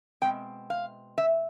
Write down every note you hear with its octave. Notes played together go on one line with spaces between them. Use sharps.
B2 G#3 C4 G5
F5
E5